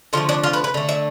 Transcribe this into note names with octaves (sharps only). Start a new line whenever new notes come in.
D3 F3 A3 F4
D4
F4
B4
B4
D3 A3
E5